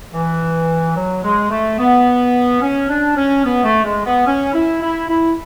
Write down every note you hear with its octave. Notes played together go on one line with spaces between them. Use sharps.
E3
F#3
G#3
A3
B3
C#4
D4
C#4
B3
A3
G#3
B3
C#4
E4
E4
E4